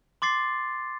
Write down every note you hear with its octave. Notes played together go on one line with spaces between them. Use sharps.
C6 D6 A6 C7